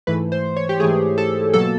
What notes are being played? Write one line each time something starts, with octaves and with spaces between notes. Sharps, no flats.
G#2 E3 A3 B4
C5
C#5
G4
G#2 E3 A3 G#4
A4
B2 F#3 A#3 A4